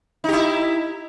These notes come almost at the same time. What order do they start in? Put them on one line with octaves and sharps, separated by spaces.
D#4 G4 E4